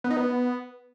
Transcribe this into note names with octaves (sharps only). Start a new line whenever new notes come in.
B3
D#4
B3